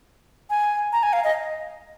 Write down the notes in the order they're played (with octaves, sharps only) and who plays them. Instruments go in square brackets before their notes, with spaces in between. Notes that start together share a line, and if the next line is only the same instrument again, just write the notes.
[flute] G#5
A#5
G#5
F5
D#5